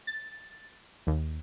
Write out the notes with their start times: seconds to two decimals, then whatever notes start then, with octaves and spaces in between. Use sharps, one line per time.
0.07 A6
1.07 D#2